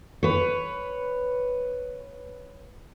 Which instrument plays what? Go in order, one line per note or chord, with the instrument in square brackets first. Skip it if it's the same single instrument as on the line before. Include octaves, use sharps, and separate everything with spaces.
[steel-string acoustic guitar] B4 C#5